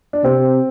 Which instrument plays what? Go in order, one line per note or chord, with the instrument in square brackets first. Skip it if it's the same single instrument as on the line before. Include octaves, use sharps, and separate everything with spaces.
[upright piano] D4
[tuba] C3 [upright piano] C4